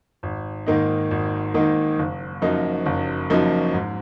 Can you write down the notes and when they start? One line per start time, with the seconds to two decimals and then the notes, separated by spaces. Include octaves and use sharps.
0.23 G#1
0.66 G#2 D#3 A#3 D#4
1.11 G#1
1.54 G#2 D#3 A#3 D#4
1.99 F#1
2.42 F#2 F3 A#3 D#4
2.86 F#1
3.30 F#2 F3 A#3 D#4
3.74 G#2